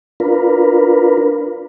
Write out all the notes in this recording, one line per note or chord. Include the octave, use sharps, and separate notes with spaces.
D4 F4 A#4 B4